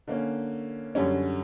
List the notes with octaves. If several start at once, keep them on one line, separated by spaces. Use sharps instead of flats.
D3 A#3 C#4
F#2 D3 G3 C#4